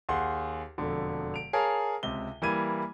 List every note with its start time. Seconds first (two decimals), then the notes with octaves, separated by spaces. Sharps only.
0.09 D#2 G#4 F#5 C6
0.78 E1 F2 D3
1.34 D7 F7
1.53 G#4 A#4 C#5 F5 A5
2.03 C#2 C3 G7
2.42 E3 G3 A#3 E4 G#6 D#7